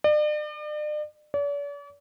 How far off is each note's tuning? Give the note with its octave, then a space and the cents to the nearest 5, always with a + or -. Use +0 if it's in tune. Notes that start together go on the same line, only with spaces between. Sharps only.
D5 +40
D5 -45